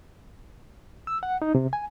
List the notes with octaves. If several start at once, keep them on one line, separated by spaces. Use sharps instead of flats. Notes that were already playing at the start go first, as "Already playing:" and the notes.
E6
F#5
D#4
C3
G#5